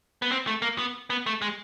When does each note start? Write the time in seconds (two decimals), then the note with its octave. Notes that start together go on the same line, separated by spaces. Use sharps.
0.22 B3
0.32 C4
0.47 A3
0.62 A#3
0.78 B3
1.10 B3
1.26 A3
1.42 G#3